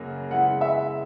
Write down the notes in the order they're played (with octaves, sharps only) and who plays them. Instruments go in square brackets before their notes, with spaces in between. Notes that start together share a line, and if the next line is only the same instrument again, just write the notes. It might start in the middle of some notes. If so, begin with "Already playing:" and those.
Already playing: [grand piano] F#2 C#3 F#3 A#3
[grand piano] C#3 G#3 B3 E4 [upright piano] F#5
[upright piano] E5